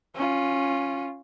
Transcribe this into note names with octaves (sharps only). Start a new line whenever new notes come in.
C#4 F4